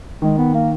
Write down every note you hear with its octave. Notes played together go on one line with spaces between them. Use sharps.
D#3 G#3
B3
A#3